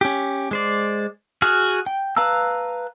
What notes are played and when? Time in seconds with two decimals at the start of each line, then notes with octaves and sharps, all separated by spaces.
0.01 C#4 G4
0.51 G#3 C5 D5
1.42 F#4 G#4 F6
1.86 G5
2.17 B4 F5 A5 A#5 E6